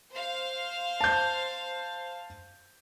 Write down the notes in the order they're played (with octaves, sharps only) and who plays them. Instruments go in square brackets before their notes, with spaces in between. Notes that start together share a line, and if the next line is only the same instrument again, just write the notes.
[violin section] C5 F5
[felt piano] A5 G6